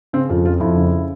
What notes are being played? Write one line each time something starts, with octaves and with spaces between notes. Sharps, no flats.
C#3 C4
F2 F4
F3 F4
F2 E4
C#3